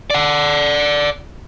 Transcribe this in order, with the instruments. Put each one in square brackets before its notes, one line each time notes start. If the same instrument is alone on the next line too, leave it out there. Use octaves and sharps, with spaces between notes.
[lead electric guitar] D5 F#5